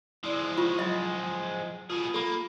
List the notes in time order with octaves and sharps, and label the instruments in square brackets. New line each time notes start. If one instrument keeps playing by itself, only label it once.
[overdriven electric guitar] F3 G#3 [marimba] E4 D5
[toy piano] F4 [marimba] C#6
[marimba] F#3 B5 A6 [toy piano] D#5
[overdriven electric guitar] B2 G#4 [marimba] F4
[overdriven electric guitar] A#3 [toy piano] A4 B5